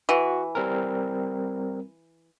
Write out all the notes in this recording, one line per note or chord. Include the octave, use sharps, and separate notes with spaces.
E3 F#4
G3 C4 A#4